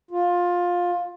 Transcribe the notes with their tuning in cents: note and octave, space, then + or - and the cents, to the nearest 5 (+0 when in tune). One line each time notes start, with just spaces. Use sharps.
F4 +15